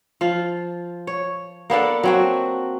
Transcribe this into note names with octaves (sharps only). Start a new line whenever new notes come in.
F3 F4
C#5
A#3 B3 D4 A4
F#3 C4 F#4